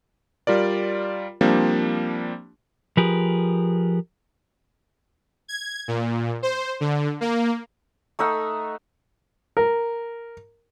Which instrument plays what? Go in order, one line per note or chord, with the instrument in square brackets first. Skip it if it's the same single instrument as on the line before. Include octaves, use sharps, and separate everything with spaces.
[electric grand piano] G3 F4 A#4 D5
F3 G3 A#3 C4 D4
[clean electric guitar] F3 G4 G#4 A#4 B4
[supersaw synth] G#6
A#2
C5
D3
A#3
[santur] A3 D#4 E5 F#5
[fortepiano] A#4